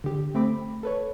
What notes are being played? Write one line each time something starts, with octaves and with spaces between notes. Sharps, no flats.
D3 G4
A3 C4 B5 D6
A4 B4 C#5